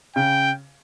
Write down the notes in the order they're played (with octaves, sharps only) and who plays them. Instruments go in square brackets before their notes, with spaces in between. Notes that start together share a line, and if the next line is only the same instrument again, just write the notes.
[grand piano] C#3 [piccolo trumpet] G5